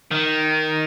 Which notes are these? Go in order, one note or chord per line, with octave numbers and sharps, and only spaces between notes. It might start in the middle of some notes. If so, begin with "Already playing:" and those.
D#3